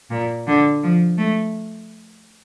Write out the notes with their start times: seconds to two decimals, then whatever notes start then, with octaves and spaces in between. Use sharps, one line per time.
0.10 A#2
0.47 D3
0.83 F3
1.18 A3